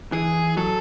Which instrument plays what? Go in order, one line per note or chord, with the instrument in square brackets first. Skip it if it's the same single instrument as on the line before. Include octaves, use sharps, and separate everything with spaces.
[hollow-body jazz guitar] E3 [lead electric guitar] G#4
[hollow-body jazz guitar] F#3 [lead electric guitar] A4